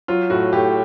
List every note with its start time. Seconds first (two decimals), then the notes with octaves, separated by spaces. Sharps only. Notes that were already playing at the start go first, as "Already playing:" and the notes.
0.08 F#3 F4
0.30 A2 F#4
0.53 A2 G4